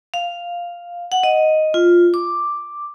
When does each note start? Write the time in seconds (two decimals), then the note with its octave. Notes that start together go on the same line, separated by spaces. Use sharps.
0.14 F5
1.12 F#5
1.23 D#5
1.74 F4
2.14 D6